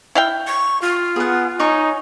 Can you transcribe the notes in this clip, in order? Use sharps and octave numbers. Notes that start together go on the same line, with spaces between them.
E4 F5 G5
C#6
F4
B3 G#4 F#5
D#4 C#5 G#5 C#6